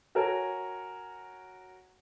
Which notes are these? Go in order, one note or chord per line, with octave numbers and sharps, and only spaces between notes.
F#4 A#4 C#5 G#5